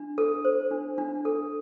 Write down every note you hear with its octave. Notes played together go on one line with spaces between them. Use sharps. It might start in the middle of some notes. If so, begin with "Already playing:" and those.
Already playing: D4
A4
C5
D4
D4
A4